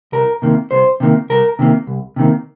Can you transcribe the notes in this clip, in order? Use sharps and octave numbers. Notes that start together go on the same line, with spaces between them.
C2 A#4
C3 D#3 A#3
C2 C5
C3 D#3 A#3
C2 A#4
C3 D#3 A#3
C2
C3 D#3 A#3